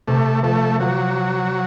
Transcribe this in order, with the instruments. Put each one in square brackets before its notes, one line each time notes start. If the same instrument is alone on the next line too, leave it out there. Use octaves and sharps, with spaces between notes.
[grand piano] C3 [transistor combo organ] A3
[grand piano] F3 [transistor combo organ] A3
[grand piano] F3 [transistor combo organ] F#3